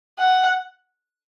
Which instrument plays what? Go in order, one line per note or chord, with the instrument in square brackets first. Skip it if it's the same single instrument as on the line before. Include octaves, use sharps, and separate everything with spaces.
[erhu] F#5